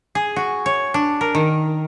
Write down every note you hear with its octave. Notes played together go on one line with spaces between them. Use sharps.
G#4
F#4
C#5
D4
A#4
D#3